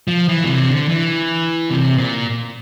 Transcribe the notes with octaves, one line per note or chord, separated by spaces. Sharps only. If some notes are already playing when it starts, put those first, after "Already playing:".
F3
E3
A#2
C3
D3
E3
C3
A#2